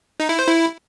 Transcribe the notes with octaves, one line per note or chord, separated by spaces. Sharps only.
D#4
E4
C5
E4